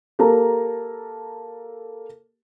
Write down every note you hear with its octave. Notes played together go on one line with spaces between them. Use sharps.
A#3 G4 A4 A#5